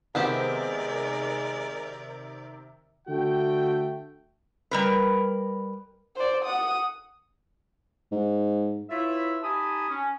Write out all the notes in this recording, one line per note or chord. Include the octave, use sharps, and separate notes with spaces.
C3 D#3 G#3 B3 C4 G4 A#4 D5
D3 A3 F#4 G5
G3 A#4 B4
C5 D5
F#5 D#6
G#2
E4 F4 B4 C#5 E5
D#4 G4 G#5 A5 B5 D#6
C#4